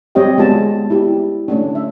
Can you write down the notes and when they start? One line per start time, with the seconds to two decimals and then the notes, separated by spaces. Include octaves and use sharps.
0.15 G3 C4 G4 C#5 D#5 G5
0.38 G#3 B3 F4 A5
0.90 E4 G4
1.48 A3 C#4 D4
1.75 E5